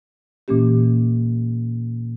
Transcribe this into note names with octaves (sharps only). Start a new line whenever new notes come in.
A#2 E3 A#3 C#4 G4